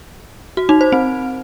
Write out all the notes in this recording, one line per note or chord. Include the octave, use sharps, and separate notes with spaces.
F#4
D#4
C5
C4